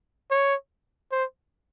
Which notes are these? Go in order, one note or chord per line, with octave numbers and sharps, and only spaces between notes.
C#5
C5